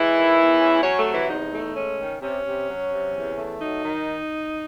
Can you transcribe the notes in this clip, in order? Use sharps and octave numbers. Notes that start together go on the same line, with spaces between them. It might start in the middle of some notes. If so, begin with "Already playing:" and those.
Already playing: E3 G#3 E4
D#3
E2
C#4
F#3 C#4 C#5
A3 A4
C3
E3 E4
E2 D#4
A3
G#3 C#4
D#3
C3 C#4
C3
F#3
C3
E2
A3
F#3 D#4
D#3